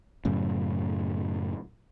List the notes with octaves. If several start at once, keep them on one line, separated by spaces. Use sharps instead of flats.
F#2 A2 C#3